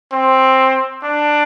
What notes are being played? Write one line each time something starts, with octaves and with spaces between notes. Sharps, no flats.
C4
D4